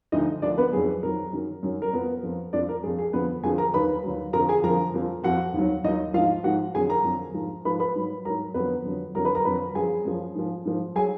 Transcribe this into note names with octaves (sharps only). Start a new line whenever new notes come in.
D2 D3 F3 D#4 D#5
D2 D3 F3 D4 D5
B3 B4
F2 D#3 F#3 G#4
F2 D#3 F#3 A#4
F#2 D#3 F#3
F#2 D#3 F#3
A#4
F2 F3 B3 B4
F2 F3
F2 F3 D4 D5
A#4
F2 F3 G#4
G#4
F2 D3 F3 B3 B4
F2 D3 F3 G#4 G#5
A#4 A#5
D#2 D#3 F#3 B4 B5
D#2 D#3 F#3
F2 D3 F3 A#4 A#5
G#4 G#5
F2 D3 F3 A#4 A#5
F2 F3
F2 F3 F#4 F#5
D#2 D#3 F#3
D#2 D#3 F#3 D#4 D#5
G#2 F3 F4 F5
G#2 F3 F#4 F#5
F2 D3 F#3 G#4 G#5
A#4 A#5
F2 D3 F#3
G#2 F3
G#2 F3 B4 B5
B4 B5
G#2 F#3
G#2 F#3 A#4 A#5
F2 D3 F#3 B3 B4
F2 D3 F#3
F2 D3 F#3 A#4 A#5
B4 B5
A#4 A#5
F2 D3 F#3 B4 B5
F#2 F3 G#4 G#5
F#2 F3
G#2 F3
G#2 F3
F#3 G#4 G#5